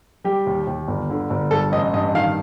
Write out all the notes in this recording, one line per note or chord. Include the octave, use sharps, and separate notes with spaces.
G3 G4
D#2
D#2
G1
D3
G1
G2 A4
A1 D#5
G2 D#5
D#3 F5